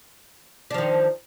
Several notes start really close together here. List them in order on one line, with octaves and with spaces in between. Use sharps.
D4 F3 D#3